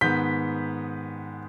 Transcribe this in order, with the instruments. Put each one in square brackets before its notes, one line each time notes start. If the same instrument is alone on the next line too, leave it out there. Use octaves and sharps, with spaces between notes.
[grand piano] G#2 D#3 B3 G6 B6